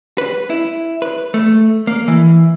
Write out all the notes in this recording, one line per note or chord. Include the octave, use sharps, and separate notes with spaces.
B4
E4
B4
A3
A#3
E3